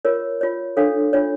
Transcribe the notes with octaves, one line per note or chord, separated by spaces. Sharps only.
F4 A#4 C#5
F4 C#5
D4 A4 C#5 F5
D4 F4 C#5